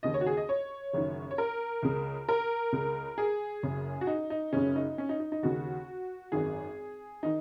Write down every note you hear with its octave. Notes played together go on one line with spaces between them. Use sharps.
D#2 C#3 D#5
C#5
F#4
G#4
D#5
C#5
F#1 F#2 D#3
C#5
A#4
C#2 C#3
A#4
C#2 C#3
G#4
F#1 F#2 C#3
F#4
D#4
D#4
F#1 F#2 C#3 C#4
D#4
C#4
D#4
D#4
D#4
D#2 C#3 F#4
G#1 F#2 D#3 G#4
D#3 D#4